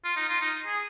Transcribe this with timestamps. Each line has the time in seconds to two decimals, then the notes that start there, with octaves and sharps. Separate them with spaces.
0.04 F4
0.17 D#4
0.29 F4
0.41 D#4
0.67 G#4